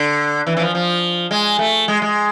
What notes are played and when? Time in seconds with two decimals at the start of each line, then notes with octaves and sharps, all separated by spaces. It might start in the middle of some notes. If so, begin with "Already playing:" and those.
Already playing: D3
0.47 E3
0.57 E3
0.60 F3
0.75 F3
1.31 G#3
1.59 A3
1.88 G#3
2.02 G#3